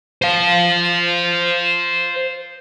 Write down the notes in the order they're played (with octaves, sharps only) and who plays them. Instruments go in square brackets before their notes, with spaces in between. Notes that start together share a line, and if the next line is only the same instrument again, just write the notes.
[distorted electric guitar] C5 F5